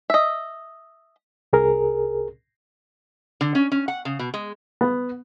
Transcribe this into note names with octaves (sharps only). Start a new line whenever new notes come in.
D#5 E5
C2 G#4 A#4
D3
C#4
C#4
F#5
C#3
B2
G#3
B3